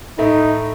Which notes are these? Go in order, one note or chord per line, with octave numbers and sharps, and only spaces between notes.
A2 A3 D#4